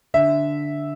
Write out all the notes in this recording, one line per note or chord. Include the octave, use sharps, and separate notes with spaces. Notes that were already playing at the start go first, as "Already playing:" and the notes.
D3 E5